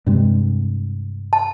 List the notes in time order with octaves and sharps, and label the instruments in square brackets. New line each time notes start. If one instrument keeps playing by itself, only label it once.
[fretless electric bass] G2 C3 G#3
[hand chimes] A5